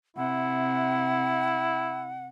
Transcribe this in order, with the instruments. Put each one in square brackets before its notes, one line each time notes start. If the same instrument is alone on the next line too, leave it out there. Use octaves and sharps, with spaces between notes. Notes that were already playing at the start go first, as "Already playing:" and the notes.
[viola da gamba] C3 [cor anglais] E4 [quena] F#5